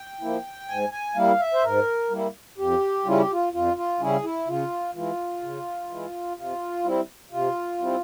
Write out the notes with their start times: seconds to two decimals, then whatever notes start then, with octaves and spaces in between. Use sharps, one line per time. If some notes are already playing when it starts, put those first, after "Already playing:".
Already playing: G5
0.21 F3 A#3 E4
0.69 G#2 G#5
0.92 G#5
1.16 G3 A#3 E4 F5
1.40 E5
1.54 C5
1.63 G#2 A#4
2.11 G3 A#3 E4
2.58 F2 G4
3.05 C#3 G3 C#4 E4 F4
3.19 G4
3.32 F4
3.53 F2 F4
3.77 F4
4.00 C#3 G3 C#4 E4 G#4
4.24 E4
4.47 C#3 F4
4.94 E3 G#3 E4 F4
5.42 C#3
5.89 E3 G#3 E4
6.37 C3 F4
6.84 G3 C4 E4
7.31 C3 F4
7.79 G3 C4 E4